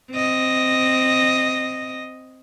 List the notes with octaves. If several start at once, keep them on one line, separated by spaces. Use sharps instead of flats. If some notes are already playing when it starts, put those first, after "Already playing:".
C4 D#5